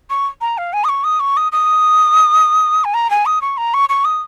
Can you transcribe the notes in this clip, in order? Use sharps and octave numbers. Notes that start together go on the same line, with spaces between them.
C#6
A#5
F5
G#5
D#6
C#6
D#6
C#6
D#6
D#6
G#5
A#5
G#5
D#6
C#6
A#5
C#6
C#6
D#6